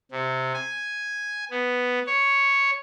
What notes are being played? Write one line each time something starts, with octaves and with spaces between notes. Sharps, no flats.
C3
G#5
B3
C#5